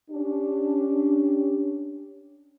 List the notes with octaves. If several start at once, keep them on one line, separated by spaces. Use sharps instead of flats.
C#4 D4 G4